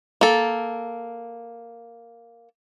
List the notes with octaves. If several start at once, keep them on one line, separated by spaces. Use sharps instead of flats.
A#3 A4